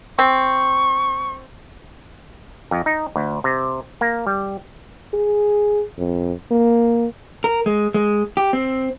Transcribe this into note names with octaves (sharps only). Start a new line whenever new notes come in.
C4 C#6
F2
D#4
D2
C3
A#3
G3
G#4
F2
A#3
A#4
G#3
G#3
G4
C4